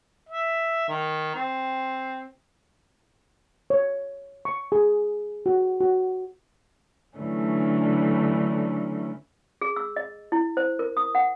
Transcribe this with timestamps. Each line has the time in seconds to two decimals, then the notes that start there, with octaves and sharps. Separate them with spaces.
0.29 E5
0.89 D#3
1.35 C4
3.70 C#5
4.45 C#6
4.72 G#4
5.46 F#4
5.80 F#4
7.18 D3 E3 F#3 A3 C#4 D4
9.61 G#4
9.76 E6
9.96 D#5
10.32 E4
10.57 C5
10.79 A#4
10.97 D#6
11.15 F#5